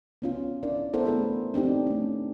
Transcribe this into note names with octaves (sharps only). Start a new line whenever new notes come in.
B3 C#4 F4
D4 E4 A#4 D5
B3 E4 A4 A#4 C5 F#5
A3 B3 G#4 A#4
C4 D4 D#4 G4
A3 C#4